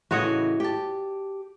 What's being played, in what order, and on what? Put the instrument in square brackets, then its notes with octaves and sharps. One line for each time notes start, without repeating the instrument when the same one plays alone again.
[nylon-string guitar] A2 C#3 E3 [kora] F#4 C#5 D#5
[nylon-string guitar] G4 A5